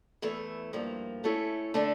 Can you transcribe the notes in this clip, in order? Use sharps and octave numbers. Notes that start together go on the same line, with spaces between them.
E2 E3 A3
G2 F3 A#3
A3 C#4 E4 A4 C#5
D3 A3 D4 A4